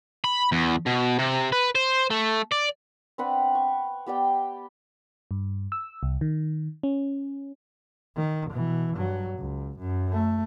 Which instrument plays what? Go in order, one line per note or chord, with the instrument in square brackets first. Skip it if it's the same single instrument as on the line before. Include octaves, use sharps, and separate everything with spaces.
[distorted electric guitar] B5
E2
B2
C3
B4
C5
A3
D5
[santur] C4 D4 B4 F#5
C#6
B3 G4 D5 G5
[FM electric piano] G2
E6
C2
D#3
C#4
[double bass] D#3
B2 E3
G2 F#3
C#2
F#2
A3